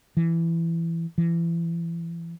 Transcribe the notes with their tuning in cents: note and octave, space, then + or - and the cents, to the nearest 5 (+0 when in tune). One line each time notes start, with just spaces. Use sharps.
E3 +15
E3 +30